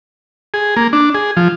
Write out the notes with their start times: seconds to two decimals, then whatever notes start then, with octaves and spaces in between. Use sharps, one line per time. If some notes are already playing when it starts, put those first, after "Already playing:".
0.54 G#4
0.77 A#3
0.93 D4
1.15 G#4
1.37 F3